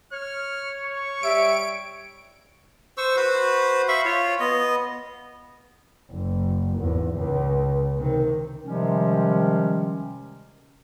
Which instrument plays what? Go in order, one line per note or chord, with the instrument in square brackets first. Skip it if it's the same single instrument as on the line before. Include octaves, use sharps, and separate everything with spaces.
[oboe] C#5 [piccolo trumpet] F6
[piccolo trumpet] C#6
[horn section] G3 E5 [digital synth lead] D7
[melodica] C5 C#6 E6
F#4 B4 C5
E5 F5 B5 C#6
F4 C#5
B3 D#5
[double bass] F#1
G#1 E2
C#2
C3 D#3
[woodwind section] C3 D#3 F3 G3 G#3 C#4